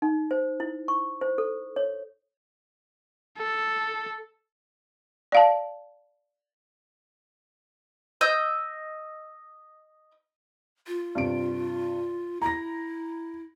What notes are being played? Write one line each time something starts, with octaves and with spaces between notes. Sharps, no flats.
D#4
C5
E4
C#6
C5
A4
C#5
A4
D5 F5 A5
D#5 E6 G6
F4
G2 C3 D7
E4 A#5 A#6